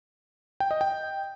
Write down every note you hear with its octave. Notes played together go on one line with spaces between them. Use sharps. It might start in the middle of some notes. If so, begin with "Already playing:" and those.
G5
D#5
G5